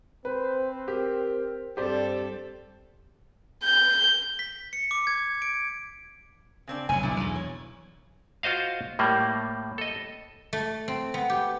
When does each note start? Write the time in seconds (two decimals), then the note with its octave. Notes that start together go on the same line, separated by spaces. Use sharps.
0.25 C4 B4 C5
0.88 G4 A#4
1.77 G2 G3 C4 G4 A4 C5 D5
3.64 G6
4.39 B6
4.73 C#7
4.91 D6
5.07 G#6
5.42 D7
6.67 C#3 C4 D4
6.89 F1 F#3 G#5
7.03 B1 D4 E4
7.16 B1 E2
7.36 C#5
8.43 F4 F#4 C5 D#5 F5
8.99 A2 G3 A#3
9.78 A4 D#5
10.53 A3
10.88 C4
11.14 B3
11.30 G4